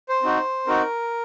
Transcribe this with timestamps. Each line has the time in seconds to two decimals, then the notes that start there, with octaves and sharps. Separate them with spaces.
0.09 C5
0.22 C4 D#4 F#4
0.67 C4 D#4 F#4 A#4